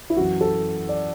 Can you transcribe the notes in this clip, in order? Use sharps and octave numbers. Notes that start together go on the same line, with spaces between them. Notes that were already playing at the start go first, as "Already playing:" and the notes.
E4
F#2 E3 F#4
A4
D5